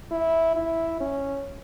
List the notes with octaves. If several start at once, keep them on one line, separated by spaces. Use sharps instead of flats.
E4
E4
C#4